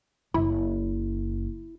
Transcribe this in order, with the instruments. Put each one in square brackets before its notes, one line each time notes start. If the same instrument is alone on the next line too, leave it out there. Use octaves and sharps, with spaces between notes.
[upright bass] F#1 [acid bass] E4